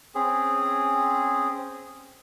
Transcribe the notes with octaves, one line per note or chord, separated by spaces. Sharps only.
C4 C#4 G#4